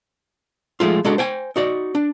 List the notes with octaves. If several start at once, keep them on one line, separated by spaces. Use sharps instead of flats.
F3 G#3 A3 F4
G#3 D4 F#4 A4
C5 G5 G#5
D#4 F#4 D5
D4